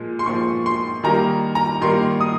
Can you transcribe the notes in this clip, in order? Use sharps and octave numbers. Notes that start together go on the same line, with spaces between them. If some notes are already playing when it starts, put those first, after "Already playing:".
Already playing: A#2 F3 G#3
C6
A#2 F3 G#3 C#6
C6
D#3 G3 A#3 A#5
A#5
D#3 G3 A#3 C6
D#6